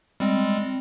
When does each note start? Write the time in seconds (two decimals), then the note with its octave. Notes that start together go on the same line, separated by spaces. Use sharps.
0.20 G3 G#3 C4